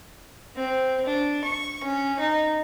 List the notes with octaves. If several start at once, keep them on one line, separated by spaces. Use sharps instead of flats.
C4
D4
C#6
C#4
D#4